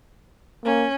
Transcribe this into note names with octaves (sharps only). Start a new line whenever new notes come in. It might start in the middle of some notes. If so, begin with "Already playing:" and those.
A#3 C#4